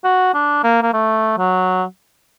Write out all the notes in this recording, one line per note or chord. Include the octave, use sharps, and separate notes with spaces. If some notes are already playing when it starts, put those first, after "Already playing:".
F#4
D4
A#3
A#3
A3
F#3